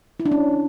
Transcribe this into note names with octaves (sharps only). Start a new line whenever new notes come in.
E4
D4
C#4